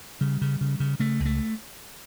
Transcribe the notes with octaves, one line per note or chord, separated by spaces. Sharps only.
C#3 G3
C#3
C#3
C#3
C#3 A3
C#2
A3